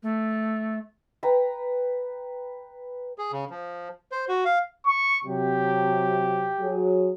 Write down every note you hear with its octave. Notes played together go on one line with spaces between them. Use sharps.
A3
B4 G5 A#5
G#4
C#3
F3
C5
F#4
F5
C#6
C3 F#3 G4
F#3 G#4